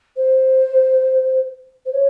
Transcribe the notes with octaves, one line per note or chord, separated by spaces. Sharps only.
C5
C5
C#5